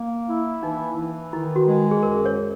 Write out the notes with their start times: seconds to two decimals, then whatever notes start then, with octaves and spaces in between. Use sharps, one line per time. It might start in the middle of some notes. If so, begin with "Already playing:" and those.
Already playing: A#3
0.28 E4
0.62 E3 D#4
0.97 E3
1.33 D#3 E4
1.56 F#4
1.67 G#3
1.91 G#4
2.02 F#2 A#4
2.26 C#5